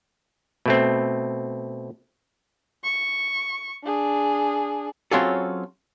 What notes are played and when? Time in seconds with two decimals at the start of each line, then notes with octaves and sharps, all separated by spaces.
0.66 B2 A3 C4
2.84 C#6
3.84 D4 G#4
5.11 F#3 C4 C#4 F4 G#4 A4